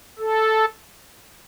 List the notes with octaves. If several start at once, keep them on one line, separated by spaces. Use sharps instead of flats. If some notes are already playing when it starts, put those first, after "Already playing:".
A4